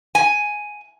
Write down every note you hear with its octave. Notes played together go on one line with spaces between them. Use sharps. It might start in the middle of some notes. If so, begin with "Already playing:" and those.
G#5